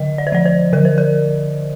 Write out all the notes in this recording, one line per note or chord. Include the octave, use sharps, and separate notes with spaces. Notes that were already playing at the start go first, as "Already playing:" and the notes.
Already playing: D3 D#5
D5
C5
F3 D5
C5
D3 A#4
C5
A#4